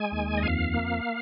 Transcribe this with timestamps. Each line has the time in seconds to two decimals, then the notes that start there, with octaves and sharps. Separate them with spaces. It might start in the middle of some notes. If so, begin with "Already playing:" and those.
Already playing: G#3 G#5
0.12 D#2
0.37 D#5
0.43 F2 F5
0.74 A#3